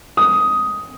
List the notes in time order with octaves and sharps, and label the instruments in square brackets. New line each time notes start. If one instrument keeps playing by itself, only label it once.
[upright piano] D#6